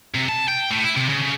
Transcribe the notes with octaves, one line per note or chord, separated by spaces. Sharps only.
C3
A5
G5
A2
E4
C3
C#3
C#3